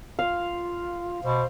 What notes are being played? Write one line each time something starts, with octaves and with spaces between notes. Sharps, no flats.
F4 F5
B2 C5